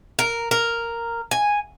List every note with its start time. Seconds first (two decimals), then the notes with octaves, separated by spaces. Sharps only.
0.19 A#4
0.51 A#4
1.31 G#5